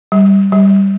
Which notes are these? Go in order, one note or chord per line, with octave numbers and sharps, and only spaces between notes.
G3
G3